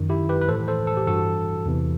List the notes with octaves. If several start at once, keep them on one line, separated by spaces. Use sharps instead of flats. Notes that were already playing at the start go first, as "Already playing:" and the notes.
Already playing: F#2 D#3
E4 G4
G4 B4
B4
A2 E3 A4 C5
A4 C5
A4
G4
G2 E3 F#4 A4
E2 C3 E3